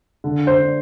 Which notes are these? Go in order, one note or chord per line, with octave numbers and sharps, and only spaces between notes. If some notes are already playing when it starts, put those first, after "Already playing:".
D3
C5
D4